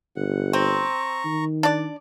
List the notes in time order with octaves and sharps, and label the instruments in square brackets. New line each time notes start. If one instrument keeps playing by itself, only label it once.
[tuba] G1 [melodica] F#5
[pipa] C4 [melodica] A#5 C#6
[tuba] D#3
[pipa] D4 D5